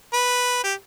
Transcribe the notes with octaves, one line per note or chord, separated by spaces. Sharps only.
B4
G4